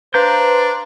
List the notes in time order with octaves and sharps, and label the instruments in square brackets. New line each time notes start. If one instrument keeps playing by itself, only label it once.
[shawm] D4 [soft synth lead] B4 [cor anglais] C5 [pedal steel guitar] F5 A#5 G6